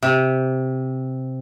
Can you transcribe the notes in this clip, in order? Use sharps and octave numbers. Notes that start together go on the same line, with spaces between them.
C3